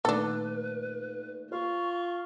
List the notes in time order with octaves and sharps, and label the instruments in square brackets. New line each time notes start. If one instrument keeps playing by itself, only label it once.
[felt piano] A#2 D#3 A3 [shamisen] D4 A4 [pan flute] B4
[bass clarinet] F4 [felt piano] C5 [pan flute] C#6